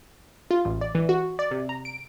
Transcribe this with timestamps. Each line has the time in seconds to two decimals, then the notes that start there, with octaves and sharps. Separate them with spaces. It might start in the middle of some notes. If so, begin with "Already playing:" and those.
0.51 F4
0.65 A1
0.81 D5
0.95 E3
1.09 F#4
1.39 D5
1.51 C3
1.69 A#5
1.85 D7